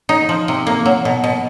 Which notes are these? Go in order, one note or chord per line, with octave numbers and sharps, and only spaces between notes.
D#4
F3
C3
A#3
F#3
B2
B2